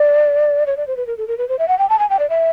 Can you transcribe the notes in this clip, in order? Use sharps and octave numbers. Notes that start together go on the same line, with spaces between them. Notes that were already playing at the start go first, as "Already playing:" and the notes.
Already playing: D5
C#5
D5
C5
B4
A#4
A4
A#4
B4
C5
E5
F#5
G5
A5
G#5
G5
D5
E5